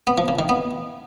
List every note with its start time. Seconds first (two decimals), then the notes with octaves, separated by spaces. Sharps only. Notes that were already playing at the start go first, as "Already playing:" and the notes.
0.07 B3
0.18 F3
0.28 C#3
0.39 D#3
0.49 B3